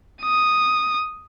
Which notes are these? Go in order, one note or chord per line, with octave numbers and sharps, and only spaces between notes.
D#6